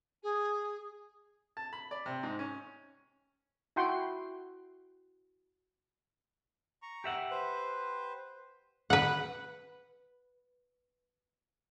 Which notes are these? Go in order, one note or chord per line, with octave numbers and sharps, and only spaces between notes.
G#4
A5
B5
D5
C3
G#2
C#4
E4 F#4 F#5 G5 C6 C#6
A#5 C#6
G4 E5 F#5
B4 C5
B4 F#5